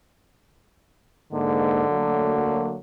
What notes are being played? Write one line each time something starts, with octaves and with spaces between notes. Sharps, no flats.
G#2 D3 A#3
F#3 A3 A#3